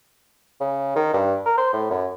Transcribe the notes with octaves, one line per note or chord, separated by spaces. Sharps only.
C#3
D#3
G2
A#4
C5
A2
F#2